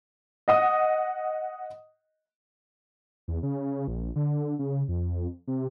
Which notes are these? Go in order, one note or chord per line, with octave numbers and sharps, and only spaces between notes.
D#5 F#5 D#6
E2
C#3
A#1
D3
C#3
F2
C3